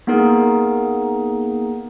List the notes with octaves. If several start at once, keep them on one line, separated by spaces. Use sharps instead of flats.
A#3 B3 D#4 G#4 A#4